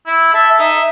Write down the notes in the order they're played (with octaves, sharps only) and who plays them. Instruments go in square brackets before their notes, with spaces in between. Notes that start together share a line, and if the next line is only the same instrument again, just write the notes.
[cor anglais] E4
[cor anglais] A4 [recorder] E5
[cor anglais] D#4 [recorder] E5